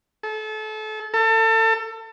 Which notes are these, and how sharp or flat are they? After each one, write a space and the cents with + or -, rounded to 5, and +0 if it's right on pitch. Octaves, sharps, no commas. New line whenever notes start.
A4 -30
A4 +30